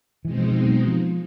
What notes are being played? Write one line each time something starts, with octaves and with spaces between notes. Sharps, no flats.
B2 E3 G#3 C4 D#4
F3
F3
F#3
F3